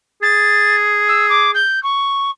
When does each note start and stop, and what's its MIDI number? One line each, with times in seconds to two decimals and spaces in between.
0.22 1.62 68
0.22 0.76 93
1.08 1.26 88
1.29 1.51 86
1.54 1.82 91
1.83 2.30 85